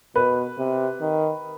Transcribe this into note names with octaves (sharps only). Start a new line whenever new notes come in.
B2 B4
C3
D#3